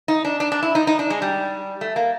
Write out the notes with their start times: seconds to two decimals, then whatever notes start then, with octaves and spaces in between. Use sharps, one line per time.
0.08 D#4
0.25 D4
0.40 D4
0.52 D4
0.63 E4
0.75 D#4
0.87 D#4
0.99 D4
1.10 G#3
1.22 G3
1.81 A3
1.96 A#3